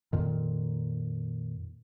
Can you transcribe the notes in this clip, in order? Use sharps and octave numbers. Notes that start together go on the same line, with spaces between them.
F2 A#2 D#3